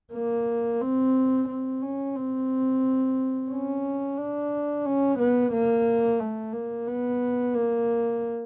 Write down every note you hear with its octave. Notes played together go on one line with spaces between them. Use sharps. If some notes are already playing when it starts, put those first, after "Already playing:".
A#3
C4
C4
C#4
C4
C#4
D4
C#4
B3
A#3
A3
A#3
B3
A#3